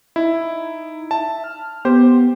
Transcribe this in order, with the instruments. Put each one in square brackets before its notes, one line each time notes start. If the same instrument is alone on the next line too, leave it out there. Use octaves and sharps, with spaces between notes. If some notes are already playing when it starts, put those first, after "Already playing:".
[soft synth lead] D#4 [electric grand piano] E4
[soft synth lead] E5 [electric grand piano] A5
[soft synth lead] F6
[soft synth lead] B3 [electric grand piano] G4 C5